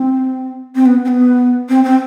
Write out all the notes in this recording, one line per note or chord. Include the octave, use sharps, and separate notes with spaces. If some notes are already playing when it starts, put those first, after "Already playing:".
Already playing: C4
C4
B3
C4
B3
C4
C4